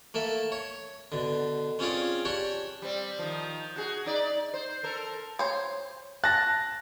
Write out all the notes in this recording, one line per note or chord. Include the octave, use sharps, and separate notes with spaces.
A3 A#3 A4 E5
C#5
B2 D3
C4 C#4 F4 G#4 C#5 D5
D4 G4 C#5
G3 C4
D#3 F3
F#4 G#4
D#4 D5
C5
A4 A#4 C5
C5 C#5
A5 F#6 A#6